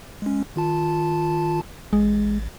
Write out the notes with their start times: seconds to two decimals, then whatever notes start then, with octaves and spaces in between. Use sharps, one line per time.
0.22 G#3 C#4
0.56 D#3 F4 A5
1.93 A1 G#3